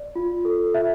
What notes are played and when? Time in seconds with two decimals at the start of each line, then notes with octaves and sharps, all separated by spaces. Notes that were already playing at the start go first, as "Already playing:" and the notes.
Already playing: D5
0.15 F4
0.45 A4
0.74 F4 E5